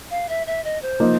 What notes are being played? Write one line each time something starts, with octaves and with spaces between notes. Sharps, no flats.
F5
E5
E5
D#5
C5
F3 A#3 D#4